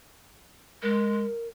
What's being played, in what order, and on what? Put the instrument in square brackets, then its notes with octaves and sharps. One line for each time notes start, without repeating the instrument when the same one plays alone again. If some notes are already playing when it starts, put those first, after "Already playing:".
[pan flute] G#3 [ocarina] A#4